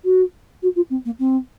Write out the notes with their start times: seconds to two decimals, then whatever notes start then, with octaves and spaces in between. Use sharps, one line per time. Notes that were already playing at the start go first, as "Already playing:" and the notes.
0.04 F#4
0.62 F#4
0.75 F4
0.90 C4
1.05 A#3
1.19 C4